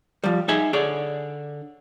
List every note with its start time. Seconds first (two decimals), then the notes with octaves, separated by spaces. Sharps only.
0.24 F3 G3
0.48 D#4 G#4 E5 G#5
0.73 D3 G#4 C#5 D5